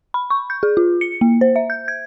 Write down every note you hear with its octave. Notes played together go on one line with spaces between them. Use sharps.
B5
C#6
G6
G#4
F4
C#7
A#3
C5
E5
G6
G#6